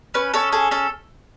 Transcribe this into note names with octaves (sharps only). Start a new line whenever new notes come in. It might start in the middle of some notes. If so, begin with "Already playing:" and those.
C#4 B4
C#4 A4
G#4 A4
C#4 A4